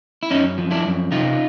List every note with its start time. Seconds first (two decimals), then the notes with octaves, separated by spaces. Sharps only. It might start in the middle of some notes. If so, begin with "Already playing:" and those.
0.23 E4
0.30 F#2 C#4 D#4
0.58 F3
0.71 D4 E4
0.85 F#2
1.11 C3 D#4 F4